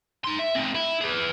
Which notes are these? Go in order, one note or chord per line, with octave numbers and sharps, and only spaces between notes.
D#4 C6
E5
C4 D#4
E4
G#4 B4